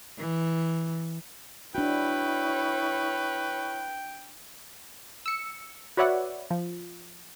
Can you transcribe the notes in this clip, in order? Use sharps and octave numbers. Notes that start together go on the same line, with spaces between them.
E3
D4 E4 F#4 B4 C#5 G5
E6 C#7
F#4 B4 C#5 D5 E5 F#5
F3